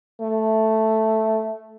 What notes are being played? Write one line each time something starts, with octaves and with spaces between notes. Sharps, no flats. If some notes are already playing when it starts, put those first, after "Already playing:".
A3